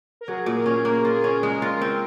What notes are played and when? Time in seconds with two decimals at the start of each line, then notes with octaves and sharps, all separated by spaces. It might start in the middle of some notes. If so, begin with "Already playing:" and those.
0.21 A#4
0.28 F#3 G#4
0.46 A#2
0.56 A#4
0.66 C#4
0.85 A#3 A#4
1.05 F4
1.13 G#4
1.24 C#4
1.42 G#3 A#4
1.62 F4
1.81 C4